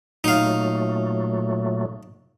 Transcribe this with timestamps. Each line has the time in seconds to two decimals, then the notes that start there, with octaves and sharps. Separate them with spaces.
0.24 A#2 F#3 A3 D#4 F5